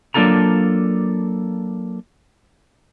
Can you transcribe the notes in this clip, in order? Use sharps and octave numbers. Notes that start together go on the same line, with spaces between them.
F#3 A#3 D4 F4 A4 A#5